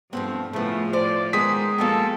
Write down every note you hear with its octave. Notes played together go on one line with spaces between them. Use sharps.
G2 F3 A3 B3 C4
A2 C#3 F3 A3 B3
C5 D5
D#3 G#3 B3 C5 D#6 B6
B2 F3 A#3 F#4 A4 G5